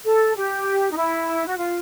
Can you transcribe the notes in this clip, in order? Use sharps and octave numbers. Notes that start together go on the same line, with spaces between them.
A4
G4
D#4
E4
F#4
F4